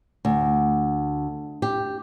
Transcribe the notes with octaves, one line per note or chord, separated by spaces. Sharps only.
D2
G4